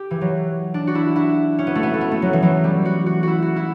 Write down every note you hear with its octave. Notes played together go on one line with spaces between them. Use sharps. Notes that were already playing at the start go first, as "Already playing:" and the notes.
Already playing: G4
E3
F#3
D4
F#4
E4
E4
C#4
B3
A3
B3
A3
B3
A3
F#3
E3
F#3
G3
F#4
F#4
E4 F#4
F#4
E4